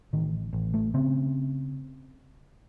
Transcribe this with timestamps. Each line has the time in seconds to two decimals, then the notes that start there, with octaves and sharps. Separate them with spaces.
0.13 A1 D#3
0.53 A1
0.74 A3
0.94 C#3 C4